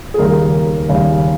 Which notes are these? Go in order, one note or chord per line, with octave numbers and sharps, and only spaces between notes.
G#4
D#2 C#3 G3 A#4
D#2 C#3 G3